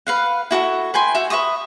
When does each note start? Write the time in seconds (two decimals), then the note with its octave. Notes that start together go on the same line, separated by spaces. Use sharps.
0.07 B4 F5 F#5
0.51 E4 F#4 G4 A4
0.94 B4 G5 G#5 C6
1.15 F#4 E5
1.30 B4 E5 C#6 D#6